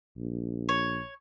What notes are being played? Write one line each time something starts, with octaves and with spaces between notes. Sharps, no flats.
A#1
C#5